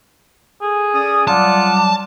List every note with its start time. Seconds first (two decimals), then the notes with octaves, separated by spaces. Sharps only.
0.62 G#4 A4
0.94 C#4 D5 D#6
1.28 F#3 G3 F4 D5 F#5 A5 D6